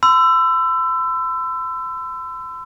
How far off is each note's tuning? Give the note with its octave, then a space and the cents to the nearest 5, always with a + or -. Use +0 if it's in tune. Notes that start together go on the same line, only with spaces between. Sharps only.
C6 -45 E6 +20